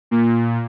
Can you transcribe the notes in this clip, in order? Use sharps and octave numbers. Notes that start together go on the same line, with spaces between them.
A#2